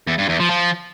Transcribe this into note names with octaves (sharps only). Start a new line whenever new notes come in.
E2
G2
E2
F3
F3